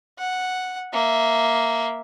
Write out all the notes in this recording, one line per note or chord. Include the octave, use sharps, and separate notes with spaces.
F#5
A#3 E5